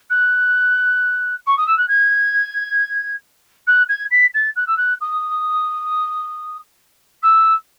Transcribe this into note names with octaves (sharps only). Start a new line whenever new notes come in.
F#6
C#6
D#6
E6
F#6
G#6
F#6
G#6
B6
A6
F#6
E6
F#6
D#6
E6